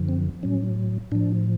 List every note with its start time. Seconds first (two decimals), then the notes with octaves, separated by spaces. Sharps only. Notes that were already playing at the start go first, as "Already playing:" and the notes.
Already playing: F#2 D3 F3
0.09 C4
0.43 A2 F#3 C#4
1.11 A2 F3 D4